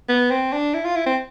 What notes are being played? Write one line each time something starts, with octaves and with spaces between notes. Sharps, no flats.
B3
C4
D4
E4
F4
E4
C4